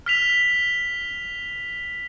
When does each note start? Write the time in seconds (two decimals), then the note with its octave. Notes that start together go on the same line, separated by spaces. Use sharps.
0.06 F6 B6 F7